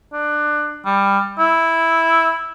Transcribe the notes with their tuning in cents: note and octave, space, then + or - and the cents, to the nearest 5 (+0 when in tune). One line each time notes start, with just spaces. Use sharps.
D4 +20
G3 +15
E4 -5